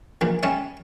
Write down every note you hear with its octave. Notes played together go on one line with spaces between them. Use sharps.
A#1 A#2 E3
G3 C#4 C#5 E5